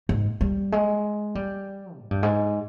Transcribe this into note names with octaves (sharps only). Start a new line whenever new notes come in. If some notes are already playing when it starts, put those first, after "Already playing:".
G#2
G3
G#3
G3
G#2
G2
G#2